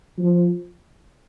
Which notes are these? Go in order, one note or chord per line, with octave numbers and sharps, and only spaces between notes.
F3